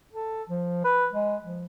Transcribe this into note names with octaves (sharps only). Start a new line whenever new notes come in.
A4
F3
B4
G#3
F3